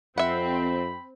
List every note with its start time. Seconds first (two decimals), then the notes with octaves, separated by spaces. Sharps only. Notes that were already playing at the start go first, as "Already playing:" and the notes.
0.18 F2 C4 E5 F#5 B5